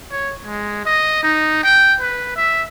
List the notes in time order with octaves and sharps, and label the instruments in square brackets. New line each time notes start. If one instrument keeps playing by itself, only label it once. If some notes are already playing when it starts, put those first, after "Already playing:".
[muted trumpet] C#5
G#3
D#5
D#4
G5
B4
E5